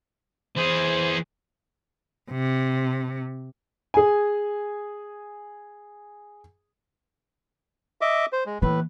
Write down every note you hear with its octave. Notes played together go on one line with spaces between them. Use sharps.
E3 G#4 C5
C3
G#4 G#5
D#5 E5 D6
C5
G#3
A2 E3 A#3 B4